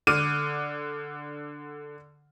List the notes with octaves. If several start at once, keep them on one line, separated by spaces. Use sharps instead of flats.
D3 D6 F6 D#7